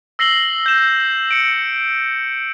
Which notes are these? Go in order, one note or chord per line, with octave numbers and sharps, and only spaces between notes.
E6 A#6 C7 F#7 G7
G6 E7
C#7 D7